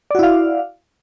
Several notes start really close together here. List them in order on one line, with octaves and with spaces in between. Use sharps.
D5 F#4 E4 F5